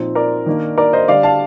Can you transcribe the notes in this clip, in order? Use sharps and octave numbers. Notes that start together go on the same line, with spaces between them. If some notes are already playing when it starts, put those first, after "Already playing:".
Already playing: A#2 F3 C4 D#4
A#4 D5
D#3 A#3 D4
A#4 D5
C5 D#5
D3 G3 D4 D5 F5
F5 A5